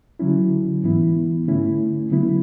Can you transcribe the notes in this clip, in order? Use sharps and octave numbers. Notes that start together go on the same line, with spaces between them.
D3 F#3 C#4 E4
G#2 E3 B3 E4
D3 A3 C#4 E4
D3 F#3 B3 E4